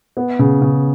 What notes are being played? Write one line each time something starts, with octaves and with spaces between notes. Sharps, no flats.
B3
C#3
C#3